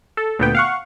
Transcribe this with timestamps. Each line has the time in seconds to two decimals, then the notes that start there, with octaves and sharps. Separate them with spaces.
0.17 A4
0.39 D2 A#2 B3 G5
0.55 F5 F#5 C#6